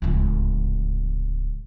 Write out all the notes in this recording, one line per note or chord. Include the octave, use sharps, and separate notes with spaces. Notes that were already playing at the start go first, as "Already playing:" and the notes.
D1 C#2